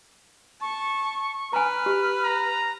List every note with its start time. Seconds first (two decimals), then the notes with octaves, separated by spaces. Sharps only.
0.61 A5 C#6
1.53 B4 G#5 A#5 F6
1.86 G4
2.24 A#5